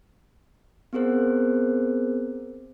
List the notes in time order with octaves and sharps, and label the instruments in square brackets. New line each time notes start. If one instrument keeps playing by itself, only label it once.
[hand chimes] B3 C4 G#4 A#4 C5